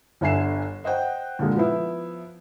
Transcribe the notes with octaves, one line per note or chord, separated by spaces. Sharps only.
G1 D3 E5 G#5 C7 E7
C5 D#5 F#5 G5
A#2 D3 G#3
F3 B3 E4